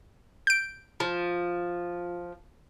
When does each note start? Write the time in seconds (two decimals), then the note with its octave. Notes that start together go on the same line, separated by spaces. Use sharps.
0.47 G6 D7
1.00 F3